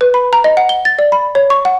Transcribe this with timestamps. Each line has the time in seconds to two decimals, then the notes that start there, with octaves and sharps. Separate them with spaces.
0.01 B4
0.14 B5
0.33 A#5
0.44 D#5
0.57 F#5
0.69 G7
0.85 A6
0.99 D5
1.12 B5
1.35 C#5
1.50 C#6
1.65 F#5